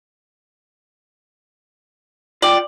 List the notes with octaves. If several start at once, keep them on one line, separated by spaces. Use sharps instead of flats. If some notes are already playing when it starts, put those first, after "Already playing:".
F4 D5 G5